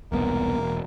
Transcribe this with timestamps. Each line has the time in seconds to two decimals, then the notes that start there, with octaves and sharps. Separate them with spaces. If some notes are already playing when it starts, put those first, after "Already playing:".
0.12 E1 C2 A#3 B3
0.58 E1